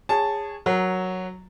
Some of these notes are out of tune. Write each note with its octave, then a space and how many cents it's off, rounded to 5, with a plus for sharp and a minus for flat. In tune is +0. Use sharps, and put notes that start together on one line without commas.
G#4 -20 C#5 +0 A5 +0
F#3 +0 A#4 +5